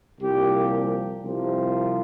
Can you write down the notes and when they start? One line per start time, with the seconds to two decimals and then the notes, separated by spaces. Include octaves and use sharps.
0.21 C2 A#2 F3 G4
1.23 C2 C3 F3